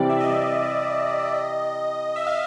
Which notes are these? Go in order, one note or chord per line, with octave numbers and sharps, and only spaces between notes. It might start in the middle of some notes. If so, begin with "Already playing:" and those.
Already playing: C3 E3 G3 C4 D5
E5
D#5
E5
F5